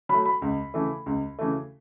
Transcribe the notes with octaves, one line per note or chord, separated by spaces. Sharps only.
F#3 A3 B5
B5
C#2
C#3 E3 A3
C#2
C#3 E3 A3